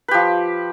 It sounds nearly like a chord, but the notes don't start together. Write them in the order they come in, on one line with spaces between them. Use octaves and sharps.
B4 G4 F3